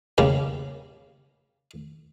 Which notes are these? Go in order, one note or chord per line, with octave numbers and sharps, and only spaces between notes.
C#3 G3 A#3